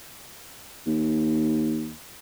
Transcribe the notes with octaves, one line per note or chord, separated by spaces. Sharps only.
D#2